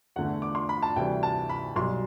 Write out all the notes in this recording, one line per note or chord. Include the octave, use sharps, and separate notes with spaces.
E2 D3 A3 F#5
D6
C6
B5
A5
D2 C3 E3 G3 G5
A5
B5
B1 B2 G3 C6